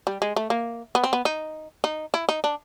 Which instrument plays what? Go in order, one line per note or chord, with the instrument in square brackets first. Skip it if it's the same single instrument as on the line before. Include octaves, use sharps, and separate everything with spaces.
[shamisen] G3
G#3
A3
A#3
B3
C4
B3
D#4
D#4
E4
D#4
D4